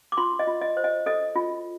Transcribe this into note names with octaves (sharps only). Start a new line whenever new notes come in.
D6
F4 C6
D#5
F4
D#5
C5
D#5
A4 D#5
F4